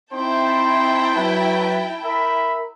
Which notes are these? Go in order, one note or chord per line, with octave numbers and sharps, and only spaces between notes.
C4 D#4 E4 C5 G5 A5
F#3 B4
A#4 E5 B5